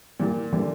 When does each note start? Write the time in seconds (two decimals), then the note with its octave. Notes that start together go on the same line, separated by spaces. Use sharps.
0.20 G2 A#2 E3 A#3 E4 G4
0.53 A#2 D3 E3 G3